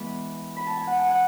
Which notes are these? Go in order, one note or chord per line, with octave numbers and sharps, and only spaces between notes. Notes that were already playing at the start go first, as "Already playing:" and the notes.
Already playing: E3 G#3 B3 B5
B5
A5
G#5
F#5
A5
G#5
F#5